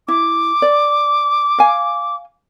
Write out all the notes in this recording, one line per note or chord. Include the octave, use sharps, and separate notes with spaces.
E4 D6
D5
F5 G#5